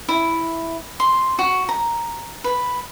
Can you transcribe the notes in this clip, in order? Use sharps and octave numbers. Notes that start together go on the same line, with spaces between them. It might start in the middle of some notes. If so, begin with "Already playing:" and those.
E4
C6
F#4
A#5
B4